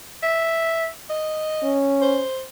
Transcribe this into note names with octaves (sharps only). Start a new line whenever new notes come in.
E5
D#5
C#4
C5